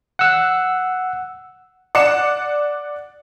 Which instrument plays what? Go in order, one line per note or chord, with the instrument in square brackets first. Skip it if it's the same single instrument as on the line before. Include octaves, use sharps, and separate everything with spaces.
[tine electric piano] F#5 E6
[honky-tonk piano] D5 F#5 C#7 E7